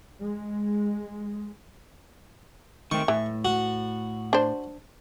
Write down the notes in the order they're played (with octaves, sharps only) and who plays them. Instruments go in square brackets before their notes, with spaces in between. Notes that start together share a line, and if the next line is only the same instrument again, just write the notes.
[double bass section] G#3
[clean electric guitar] D#3 A3 C4 [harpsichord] C#6
[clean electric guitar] A2 [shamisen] E3
[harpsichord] F#4
[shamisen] D4 C5